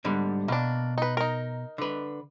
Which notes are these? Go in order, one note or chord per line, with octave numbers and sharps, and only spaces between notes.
G#2 D3 G3
B2 A#3 D4
D#4 B4
D#4 A#4
D3 B4